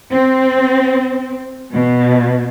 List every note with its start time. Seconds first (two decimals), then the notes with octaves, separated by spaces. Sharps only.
0.12 C4
1.73 B2